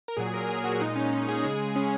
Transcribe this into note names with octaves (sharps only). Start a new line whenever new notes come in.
A#4
A#2 F#3 G#4
A#4
G#4
F#4
A#2 G#3 D#4
C#4
G#4
C#3 G#3 G#4
G#4
C#4